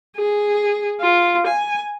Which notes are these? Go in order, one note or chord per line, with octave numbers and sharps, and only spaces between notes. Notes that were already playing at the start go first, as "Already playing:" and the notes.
G#4
F4
G#5